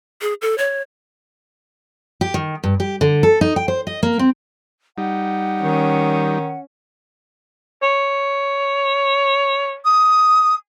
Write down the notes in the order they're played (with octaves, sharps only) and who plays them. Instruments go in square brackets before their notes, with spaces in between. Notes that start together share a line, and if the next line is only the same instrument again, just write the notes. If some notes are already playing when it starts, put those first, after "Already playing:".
[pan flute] G#4
A4
C#5
[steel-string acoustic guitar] G4
D#3
G2
G4
D3
A4
D#4
G5
C5
D#5
A#3
C4
[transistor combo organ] G3 D#4 [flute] F#5
[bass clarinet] D#3 [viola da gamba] C#4
[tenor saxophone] C#5
[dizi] D#6